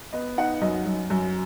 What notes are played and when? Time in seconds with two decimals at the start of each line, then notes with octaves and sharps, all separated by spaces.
0.13 B3 D#5
0.38 D#4 F#5
0.61 F#2 D#5
0.86 F#2
1.10 F#2